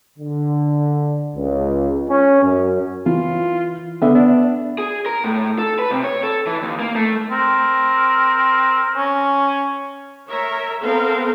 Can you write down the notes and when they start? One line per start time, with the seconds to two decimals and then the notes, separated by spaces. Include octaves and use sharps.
0.18 D3
1.35 C#2
2.08 C#4
2.42 F#2
3.06 E3 F4
4.02 D3 B3 E5
4.15 D4
4.78 G#4
5.06 A#4
5.24 A2
5.58 A4
5.79 B4
5.91 C3
6.04 C#5
6.23 A4
6.47 E3
6.62 D#2
6.80 A#3
6.96 A3
7.31 C4 A#4
8.96 C#4
10.28 A#4 C#5 E5
10.82 B3 C4 A4 A#4 C5 F5